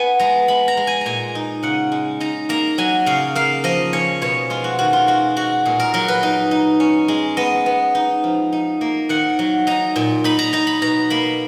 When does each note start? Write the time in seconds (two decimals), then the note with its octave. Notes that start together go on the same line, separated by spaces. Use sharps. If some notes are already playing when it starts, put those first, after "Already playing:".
Already playing: B3 G#5
0.19 G#3 A#5
0.48 G#3 B5
0.68 A#5
0.77 G#3
0.87 G#5
1.01 A#2 G#5 A#5
1.35 D#4
1.63 C#3 F#5
1.92 G#3
2.20 D#4 A#5
2.49 A#3 A#5
2.78 F#3 G#5
3.06 C#3 F5
3.35 A#3 F5
3.64 F3 D#5
3.93 C#4 C#5
4.22 B2 C#5
4.50 G#3 F4
4.64 F#4
4.79 D#3 F#4
4.93 F4
5.07 G#3 F#4
5.36 G#3 F#4
5.65 A#2 G#4
5.80 A#4
5.94 F#3 A#4
6.08 B4
6.23 D#4
6.51 D#4
6.80 C#4
7.08 G#3
7.37 B3 D#5
7.66 B3
7.95 D#4
8.24 F3
8.52 D#4
8.81 A#3
9.09 D#3 F#5
9.39 F#3
9.67 D#4 A#5
9.96 A#2
10.24 D#4 B5
10.39 A#5
10.53 D#4 A#5
10.67 B5
10.82 B2 A#5
11.10 A#3 B5